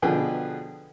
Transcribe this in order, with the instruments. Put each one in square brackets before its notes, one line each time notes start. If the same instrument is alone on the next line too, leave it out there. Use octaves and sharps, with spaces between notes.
[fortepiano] B2 D3 F3 G#4 B4 G5